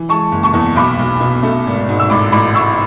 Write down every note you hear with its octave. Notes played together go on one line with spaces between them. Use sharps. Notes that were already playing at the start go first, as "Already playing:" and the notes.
Already playing: E3
G#3 A5 C#6
F#1
A5 C#6
E2
B1 B5 D6
B1
B2
A3
G#1
G#2
E6
A1 B5 D6
A1 B5 D6
A2 C#6 E6